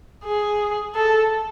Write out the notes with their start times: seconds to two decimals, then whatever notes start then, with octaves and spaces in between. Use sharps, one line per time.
0.25 G#4
0.95 A4